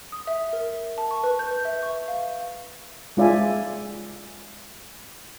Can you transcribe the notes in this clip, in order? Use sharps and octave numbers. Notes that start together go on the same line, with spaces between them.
D#6
E5
A#4
A5
C#6
B4
G6
B4
E5
C#6
F5
G#3 F4 D5 E5 G#5